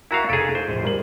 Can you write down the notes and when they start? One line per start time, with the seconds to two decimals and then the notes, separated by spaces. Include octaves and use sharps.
0.11 E4 F#4 A#4 F5 A#5 C#6
0.29 F1 G#4 A4 B6 D7
0.55 C5
0.68 D1 F2
0.83 G3 A#4 F#7